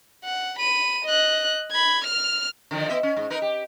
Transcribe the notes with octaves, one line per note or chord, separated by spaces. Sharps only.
F#5
B5 D#7
D#5 F#6
B5 G#6
F6 F7
D3 D#3 F3
B3 D#5 E5
C#4
G#2
D#4 A#4 B4
G4